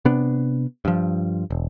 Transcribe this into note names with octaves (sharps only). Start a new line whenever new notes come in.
C3 B3 D4
G2 F3
E1